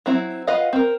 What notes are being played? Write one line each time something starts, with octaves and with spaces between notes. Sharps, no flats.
F#3 C4 E4
F4 B4 D#5 F5 F#5
C4 A#4